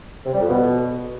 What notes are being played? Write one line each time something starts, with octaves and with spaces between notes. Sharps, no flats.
C3
G3
F2
B2